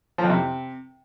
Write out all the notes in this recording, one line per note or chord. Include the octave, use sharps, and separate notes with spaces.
F3
F2
C3